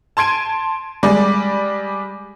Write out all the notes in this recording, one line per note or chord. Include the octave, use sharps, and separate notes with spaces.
A5 C6 G#6 D7 D#7
G3 G#3 D5